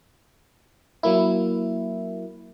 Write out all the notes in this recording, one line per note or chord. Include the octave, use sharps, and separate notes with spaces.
F#3 A#3 E4